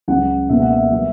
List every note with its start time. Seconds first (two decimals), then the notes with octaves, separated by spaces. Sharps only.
0.08 C#2 C#3 F#3 F#5
0.49 C#2 B2 A#3 E5
0.60 F#5
0.70 E5
0.91 F#3 B3 E5